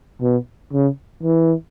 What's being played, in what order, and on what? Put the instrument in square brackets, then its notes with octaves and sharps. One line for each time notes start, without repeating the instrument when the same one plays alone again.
[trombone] B2
C#3
E3